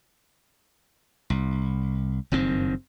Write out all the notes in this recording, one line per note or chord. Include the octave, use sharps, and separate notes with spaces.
C2
F#1 G2 D#3 C4